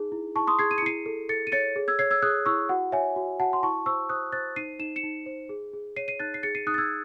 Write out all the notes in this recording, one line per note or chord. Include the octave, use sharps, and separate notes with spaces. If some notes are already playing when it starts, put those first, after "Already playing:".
Already playing: D#4 G#4
E4
E4 A5 C#6
C6 D#6
G#4 G#6 C7
D#7
C#7
E4 C7 D#7
A4
A4 A6 C#7
D#7
C#5 A6 C#7
G#4
E6 G#6
C#5 G#6 C7
E6 G#6
G#4 D#6 F#6
E4 C#6 E6
F#4 F#5
C#5 E5 G#5
F#4
F#4 F#5 A5
C6
E4 A5 C#6
C5 C#6 E6
C5 D#6 F#6
C5 F#6 A6
D#4 C7 D#7
D#4 E7
C#7 E7
D#4
C5
G#4
G#4
C#5 C7 D#7
C7 D#7
D#4 F#6 A6
C7
G#4 A6 C#7
C7 D#7
D#4 D#6 F#6
A6
E6 G#6